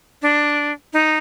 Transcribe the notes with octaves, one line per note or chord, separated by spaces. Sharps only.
D4
D#4